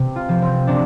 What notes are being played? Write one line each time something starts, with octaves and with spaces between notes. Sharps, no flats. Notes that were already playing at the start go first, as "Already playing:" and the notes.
Already playing: C3
F4
F3
C4
C3 D4